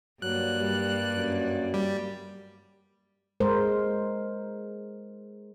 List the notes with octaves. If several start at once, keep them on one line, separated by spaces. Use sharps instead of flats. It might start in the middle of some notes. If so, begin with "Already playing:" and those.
G2 F#3 A#3 D5 F#6
G3
F#2
G3
G#3 A#4 C5